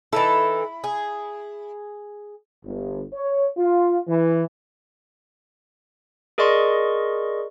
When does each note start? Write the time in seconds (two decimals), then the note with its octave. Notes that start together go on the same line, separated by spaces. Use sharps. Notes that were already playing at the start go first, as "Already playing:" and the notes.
0.13 E3 D#4 E4 A4
0.84 G#4
2.64 G1
3.13 C#5
3.57 F4
4.08 E3
6.38 G#4 A#4 D5 D#5 C6 C#6